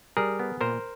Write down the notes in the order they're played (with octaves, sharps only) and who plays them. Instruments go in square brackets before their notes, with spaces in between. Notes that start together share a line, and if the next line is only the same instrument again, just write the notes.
[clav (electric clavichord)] G3 G#4 A#4
B3
A#2 A#4 C5